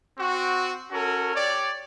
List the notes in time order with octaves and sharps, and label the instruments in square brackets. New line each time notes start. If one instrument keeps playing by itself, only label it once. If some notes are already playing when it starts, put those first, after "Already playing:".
[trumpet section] C4 F#4
C#4 F#4 A4 A#4
G4 C#5 D5